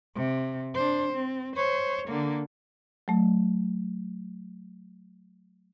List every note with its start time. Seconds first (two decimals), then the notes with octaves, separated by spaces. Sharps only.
0.16 C3
0.75 D4 C5
1.13 C4
1.56 C5 C#5
2.08 D3 A#3
3.08 F#3 A3